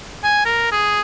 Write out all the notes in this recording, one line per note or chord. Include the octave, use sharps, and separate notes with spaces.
G#5
A#4
G#4